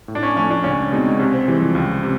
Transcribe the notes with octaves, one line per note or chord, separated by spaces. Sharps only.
A2
D4
C#4
F3 A3 C#4
D4
C#2 C#4
B2 G#3 C4 D#4
C3 C#4
C4
E3 G3 G#3
F3
C#2
C3